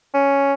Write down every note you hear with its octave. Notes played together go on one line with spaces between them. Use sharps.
C#4